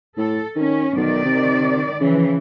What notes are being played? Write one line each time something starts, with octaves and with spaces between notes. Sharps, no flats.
A2 A4
D#3 C#4
B1 D#3 D5
C3
C#3 E3 F3